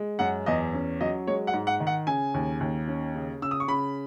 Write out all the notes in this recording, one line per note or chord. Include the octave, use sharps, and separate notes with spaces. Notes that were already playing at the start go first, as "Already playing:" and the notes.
Already playing: G#3
F#2 F#5
E2 D#5
C#4
F#3 D#5
G#3 C#5
F#5
G#2
F#5
D#3
F#5
C#3 G#5
D#2
D#2
C#4
C#3
C#3 E6
D#6
C#6
C#3 B5